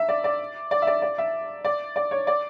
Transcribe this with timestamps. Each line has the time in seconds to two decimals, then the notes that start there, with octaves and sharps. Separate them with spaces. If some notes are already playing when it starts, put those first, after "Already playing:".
Already playing: E5
0.09 D5
0.24 D5
0.71 D5
0.82 E5
0.87 D5
1.02 D5
1.18 E5
1.65 D5
1.96 D5
2.11 C#5
2.27 D5